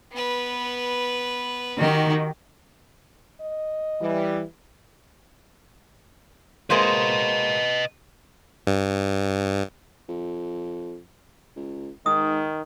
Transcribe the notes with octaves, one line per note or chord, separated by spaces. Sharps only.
B3 B4
D#3 F#4 G4
D#5
E3 G3
G#3 A#3 B4 C5 D#5
G2
F2
C#2
G#2 D#3 D#6